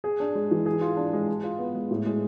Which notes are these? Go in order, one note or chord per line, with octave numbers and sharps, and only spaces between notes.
G#4
D4
G#3
E3
G#4
F4
D4
G#3
G#4
F4
B3
G#3
A2
G#3